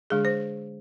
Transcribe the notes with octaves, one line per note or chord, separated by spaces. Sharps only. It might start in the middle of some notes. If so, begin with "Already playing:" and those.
D3 G#3 D4 G#4
C5